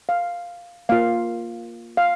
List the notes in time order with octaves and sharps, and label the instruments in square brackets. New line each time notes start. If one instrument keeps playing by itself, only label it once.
[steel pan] F5
A#3 F4 F5
F5